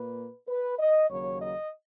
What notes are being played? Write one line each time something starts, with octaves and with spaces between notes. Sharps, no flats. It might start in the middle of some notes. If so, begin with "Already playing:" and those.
Already playing: A#2 A#3 B4
B4
D#5
D#2 C#3 F#3 A#3 C#5
D#5